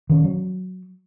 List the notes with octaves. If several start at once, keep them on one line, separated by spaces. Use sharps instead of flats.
D#3 C#4
F#3